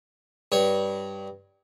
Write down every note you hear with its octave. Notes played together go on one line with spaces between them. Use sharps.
G2 C#5